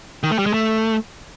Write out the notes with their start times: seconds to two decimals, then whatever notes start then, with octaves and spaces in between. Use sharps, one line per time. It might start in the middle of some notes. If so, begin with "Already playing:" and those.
0.23 D#3
0.31 A3
0.39 G3
0.46 G#3
0.54 A3